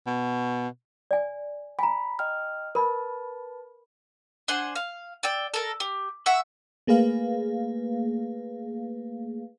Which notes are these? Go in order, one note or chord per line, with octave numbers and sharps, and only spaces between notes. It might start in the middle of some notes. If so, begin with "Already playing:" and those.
B2
D5 G#5
G#5 A#5 B5
D#5 G5 F6
A#4 B4 A5 B5
D4 C5 F#5 G#5
F5
D5 G5 E6
A4 A#4
G4
E5 F#5 C#6
A3 A#3 G#4 B4 F5